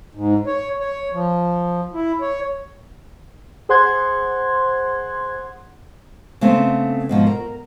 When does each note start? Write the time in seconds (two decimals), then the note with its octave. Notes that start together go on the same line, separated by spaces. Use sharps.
0.15 G#2
0.47 C#5
0.80 C#5
1.13 F3
1.94 E4
2.21 C#5
3.69 G#4 C5 F#5 C6 F#6 G#6
6.41 C#3 A3 B3 C4
7.09 G#2 B2 F3
7.27 A#4